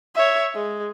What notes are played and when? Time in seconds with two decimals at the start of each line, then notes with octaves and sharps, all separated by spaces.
0.15 C#5 E5
0.54 G#3